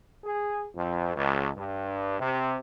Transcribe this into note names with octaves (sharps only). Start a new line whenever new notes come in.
G#4
F2
C#2
G2
C3